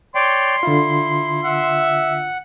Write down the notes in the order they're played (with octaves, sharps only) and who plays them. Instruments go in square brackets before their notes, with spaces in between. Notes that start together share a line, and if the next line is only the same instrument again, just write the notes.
[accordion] C#5 D5 G5 [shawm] C6
[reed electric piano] D3 F4 [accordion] E4
[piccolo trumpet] E5 [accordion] F#5